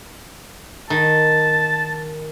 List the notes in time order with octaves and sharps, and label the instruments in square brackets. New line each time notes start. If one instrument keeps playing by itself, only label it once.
[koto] D#3 [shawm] A5